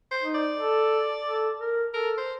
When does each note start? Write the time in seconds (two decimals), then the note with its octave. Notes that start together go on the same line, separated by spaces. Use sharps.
0.11 C5
0.23 D#4
0.35 D5
0.57 A4
1.25 A4
1.60 A#4
1.94 A4 A#4
2.18 C5